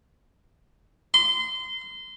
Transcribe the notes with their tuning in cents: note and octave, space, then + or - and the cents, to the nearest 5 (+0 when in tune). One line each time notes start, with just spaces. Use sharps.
C6 -25